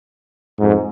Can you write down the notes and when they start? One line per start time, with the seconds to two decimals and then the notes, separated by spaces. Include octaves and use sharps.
0.59 F2 G#2